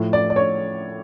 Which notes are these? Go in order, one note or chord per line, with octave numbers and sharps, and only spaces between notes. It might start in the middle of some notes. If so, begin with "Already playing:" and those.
Already playing: A2 F3
D5
D5
C#5